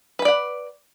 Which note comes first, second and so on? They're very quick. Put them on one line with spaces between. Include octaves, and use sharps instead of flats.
B4 B5 D5 F#5